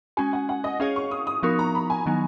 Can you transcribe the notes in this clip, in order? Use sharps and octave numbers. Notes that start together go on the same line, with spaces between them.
G#3 C#4 F#4 G#5
F#5
F#5
D#5
C#4 G#4 C#5 F5
C#6
D#6
D#6
F3 B3 D#4 F#4 A#4 C#6
A#5
B5
G#5
D#3 F#3 B3 D#4